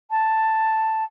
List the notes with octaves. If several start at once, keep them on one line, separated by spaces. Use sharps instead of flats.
A5